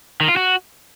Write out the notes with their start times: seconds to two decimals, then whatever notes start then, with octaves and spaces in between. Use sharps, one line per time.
0.21 D#3
0.29 F4
0.37 F#4